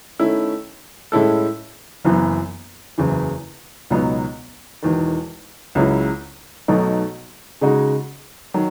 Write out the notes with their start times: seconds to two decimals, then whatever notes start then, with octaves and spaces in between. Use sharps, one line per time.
0.19 D#3 A3 C#4 E4
1.12 A2 G#3 C#4 E4 A4
2.05 F#1 F#2 E3 B3
2.98 F#1 E2 C#3 E3
3.90 C#2 B2 F#3 B3 D#4
4.82 E1 E2 D#3
5.75 C#2 C#3 F#3 C#4 E4
6.68 B1 B2 F#3 A3 D#4
7.61 C#3 G#3 D#4 F#4
8.54 D#3 F#3